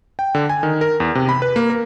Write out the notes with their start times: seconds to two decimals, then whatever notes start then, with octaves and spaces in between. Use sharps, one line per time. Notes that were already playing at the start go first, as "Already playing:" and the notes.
0.19 G5
0.35 D3
0.49 G#5
0.63 D#3
0.81 A#4
1.00 E2
1.15 C3
1.29 B5
1.42 B4
1.56 A#3
1.70 A#4